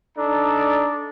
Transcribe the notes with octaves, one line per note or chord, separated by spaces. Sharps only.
D4 D#4 A4 D5 A#5